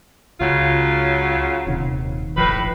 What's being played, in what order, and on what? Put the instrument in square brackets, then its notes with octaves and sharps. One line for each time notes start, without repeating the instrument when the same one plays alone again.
[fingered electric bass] C#2 [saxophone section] C#3 F#3 F4
[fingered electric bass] D#1 C3 D#3
[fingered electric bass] D#1 G#1 F3 [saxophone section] A2 B4